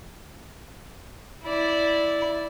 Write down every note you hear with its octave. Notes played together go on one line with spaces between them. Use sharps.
E4 D5